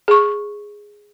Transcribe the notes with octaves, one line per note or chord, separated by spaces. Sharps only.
G#4 C#6